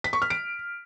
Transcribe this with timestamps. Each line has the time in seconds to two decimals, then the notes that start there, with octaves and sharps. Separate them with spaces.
0.04 B6
0.13 C#6
0.22 F6
0.30 D7